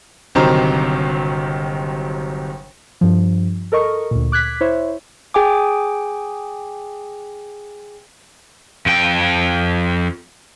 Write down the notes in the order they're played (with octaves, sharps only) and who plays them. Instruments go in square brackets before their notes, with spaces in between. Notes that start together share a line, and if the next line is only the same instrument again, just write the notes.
[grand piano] G1 C3 D#3 F#3 C5 A#5
[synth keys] G2 F3
A4 A#4 D#5 C#6
D2 A#2
D6 F#6 G#6 B6
E4 C5 C#5 E5
[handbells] G#4 G5 G#5 D6
[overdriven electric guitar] F2 G5